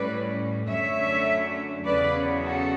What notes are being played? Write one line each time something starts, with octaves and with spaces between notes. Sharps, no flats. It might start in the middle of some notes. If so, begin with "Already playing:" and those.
Already playing: A2 G3 C#4 B4 D5
F#2 D3 A3 C#4 C#5 E5
E2 C#3 F#3 C#4 B4 D5
F#4 A4